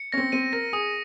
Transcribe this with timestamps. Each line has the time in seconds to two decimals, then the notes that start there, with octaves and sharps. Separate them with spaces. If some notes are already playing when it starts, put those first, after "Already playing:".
Already playing: C#7
0.12 C#4 A#6
0.17 C4
0.32 C4 D#7
0.53 A#4 A#6
0.73 G#4 D#6